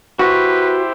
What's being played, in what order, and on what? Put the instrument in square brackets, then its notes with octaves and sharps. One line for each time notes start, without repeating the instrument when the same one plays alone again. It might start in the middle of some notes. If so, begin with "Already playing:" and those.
[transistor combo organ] E4 G4 C5 [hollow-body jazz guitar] F#4 [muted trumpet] B4